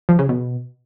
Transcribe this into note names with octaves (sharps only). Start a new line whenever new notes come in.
F3
C#3
B2